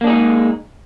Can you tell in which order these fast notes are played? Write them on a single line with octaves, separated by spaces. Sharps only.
A#3 D4 G#4 D#4 G#3